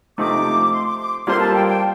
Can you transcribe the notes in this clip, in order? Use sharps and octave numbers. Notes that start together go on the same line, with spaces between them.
C3 F3 A3 C4 D#4 D6
C6
D6
D6
G3 A#3 F4 A4 C5 C6
A5
G5
G5